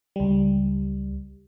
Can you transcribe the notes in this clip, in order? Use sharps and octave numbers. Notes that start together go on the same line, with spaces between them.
C#2 G3